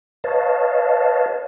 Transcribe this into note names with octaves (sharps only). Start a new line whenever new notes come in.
B4 C#5 D#5 F5 A5